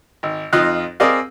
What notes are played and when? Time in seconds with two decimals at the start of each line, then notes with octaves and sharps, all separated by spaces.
0.23 G#1
0.53 F2 D#4 F4 D#5 F5 F#6
1.00 C4 G#4 A#4 D5 D#5 F5